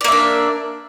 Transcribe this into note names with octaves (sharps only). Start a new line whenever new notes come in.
A#3 D4 D5 E5